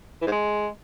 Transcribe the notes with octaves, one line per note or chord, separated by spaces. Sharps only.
E3
G#2
G#3